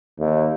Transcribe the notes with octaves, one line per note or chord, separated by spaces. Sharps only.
D#2